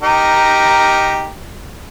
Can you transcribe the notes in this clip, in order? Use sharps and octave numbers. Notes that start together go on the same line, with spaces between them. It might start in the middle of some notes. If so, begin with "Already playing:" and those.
D#4 G4 A#4